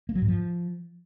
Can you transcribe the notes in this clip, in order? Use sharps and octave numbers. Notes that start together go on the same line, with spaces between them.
A#3
F#3
G#2
F3